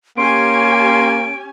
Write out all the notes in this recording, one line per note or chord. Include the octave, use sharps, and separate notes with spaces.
A#3 C#4 G4 G#5 C6 D7